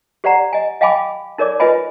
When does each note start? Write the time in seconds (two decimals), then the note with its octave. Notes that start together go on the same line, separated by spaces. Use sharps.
0.24 G4 C5 D5 F#5 A#5
0.53 D#5 G#5
0.81 D#5 F5 G5 G#5 B5 D6
1.38 D#4 A#4 C#5 D5 D6
1.60 F4 B4 C5 D#5 G#5 B5